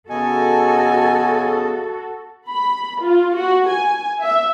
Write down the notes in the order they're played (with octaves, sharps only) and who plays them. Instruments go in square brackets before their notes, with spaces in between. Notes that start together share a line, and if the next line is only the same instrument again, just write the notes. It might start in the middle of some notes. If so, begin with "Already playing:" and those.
[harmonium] C#3 B3 D#5 [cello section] F#4 A4 [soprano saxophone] G#5
[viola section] B5
F4
F#4
G#5
E5